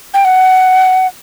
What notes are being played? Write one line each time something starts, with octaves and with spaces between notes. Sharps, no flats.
G5
F#5